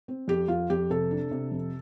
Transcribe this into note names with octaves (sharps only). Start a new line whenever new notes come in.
C4
F2 G4
F2 F4
F2 G4
C3 A4
D4
C3
F2